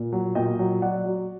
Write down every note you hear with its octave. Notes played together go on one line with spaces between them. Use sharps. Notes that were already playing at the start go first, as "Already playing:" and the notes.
Already playing: A#2
F#3
A#2 D#5 G5
F#3
F#3 D5 F#5
F#3